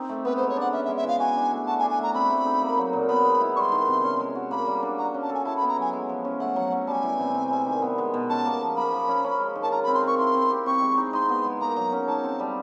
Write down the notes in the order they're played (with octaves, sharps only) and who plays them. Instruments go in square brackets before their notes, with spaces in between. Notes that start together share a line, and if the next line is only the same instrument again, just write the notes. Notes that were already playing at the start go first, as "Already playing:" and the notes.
Already playing: [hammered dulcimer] C4 D#4 G4
A3
[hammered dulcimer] B3 [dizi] B4
[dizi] C5
[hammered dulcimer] G#3
[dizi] C#5
[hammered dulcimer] D4 [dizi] F#5
[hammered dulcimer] C#4 [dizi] E5
[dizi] E5
[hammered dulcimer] G#3
[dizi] E5
[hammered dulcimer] E3 [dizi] F5
[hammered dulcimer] F#4 [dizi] G#5
[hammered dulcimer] D4
A3
[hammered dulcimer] F#4 [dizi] A5
[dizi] G#5
[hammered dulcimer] D4
[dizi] G#5
[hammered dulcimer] A3 [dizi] A#5
[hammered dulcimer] C4 [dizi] B5
[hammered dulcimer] A3
D#4
A#3
F#3
A#2
[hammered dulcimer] B3 [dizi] B5
[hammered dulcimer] G#3
E4
[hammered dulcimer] G3 [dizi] C6 C#6
[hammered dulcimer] D#3
C3
C#4
G#3
F#4
[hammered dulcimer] A#3 [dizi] B5
[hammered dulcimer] G3
D4
[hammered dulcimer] F#4 [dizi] A#5
[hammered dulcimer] C#4
[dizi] A5
[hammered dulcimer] A4 [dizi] G#5
[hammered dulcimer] E4 [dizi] A5
[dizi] B5
[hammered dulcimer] B3
[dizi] A#5
[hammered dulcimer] F#3 [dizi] G#5
[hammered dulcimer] G#3
F3
C#4
[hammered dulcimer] A3 [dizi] F#5
[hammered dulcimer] F#3
C#4
[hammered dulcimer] G3 [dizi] G#5 A5
[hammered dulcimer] E3
C3
C4
G3
D#3
B3
G#3
B2
[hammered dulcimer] C#4 [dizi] A5
[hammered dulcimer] A#3
F3
[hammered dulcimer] A#3 [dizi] B5
[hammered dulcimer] F3
C#4
C#4
G#3
D#3
[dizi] A5
[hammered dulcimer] F4 [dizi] A#5
[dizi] B5
[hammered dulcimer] C4
[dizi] C6
[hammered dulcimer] A#4 [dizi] C#6
[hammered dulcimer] E4 [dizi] C6
[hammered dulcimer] C4
G4
[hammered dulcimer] C4 [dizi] C#6
[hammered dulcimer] G#3
D#4
[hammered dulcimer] D#4 [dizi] C6
[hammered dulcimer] B3
G#3
[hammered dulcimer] A#3 [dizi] A#5
[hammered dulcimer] F#3
C#4
[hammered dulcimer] D#4 [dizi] A5
[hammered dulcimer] C4
G3